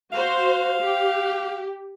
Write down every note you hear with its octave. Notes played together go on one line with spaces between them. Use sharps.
F#4 C5 F5
G4